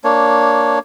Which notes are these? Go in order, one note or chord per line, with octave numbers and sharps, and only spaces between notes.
A#3 D4 C#5